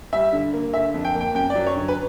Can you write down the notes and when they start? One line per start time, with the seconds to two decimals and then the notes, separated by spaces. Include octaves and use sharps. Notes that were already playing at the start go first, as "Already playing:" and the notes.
0.13 G3 E5
0.33 D3
0.53 A#3
0.74 D3 E5
0.94 F2
1.05 G5
1.15 A#3
1.21 G5
1.35 F#2 G5
1.50 D5
1.55 F#3
1.66 C#5
1.76 D3
1.88 B4